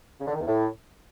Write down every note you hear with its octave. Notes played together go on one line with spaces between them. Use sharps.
C#3
D3
D#3
E2
A2